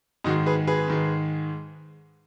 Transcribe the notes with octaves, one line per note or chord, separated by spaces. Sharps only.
G#2 D#3 G#3 D#4 F#4
G#4 B4
G#4 B4
G#2 D#3 G#3